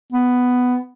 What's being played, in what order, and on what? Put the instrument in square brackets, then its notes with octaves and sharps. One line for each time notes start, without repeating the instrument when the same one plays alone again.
[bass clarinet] B3